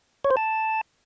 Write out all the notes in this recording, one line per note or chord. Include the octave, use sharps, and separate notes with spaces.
C#5
C5
A5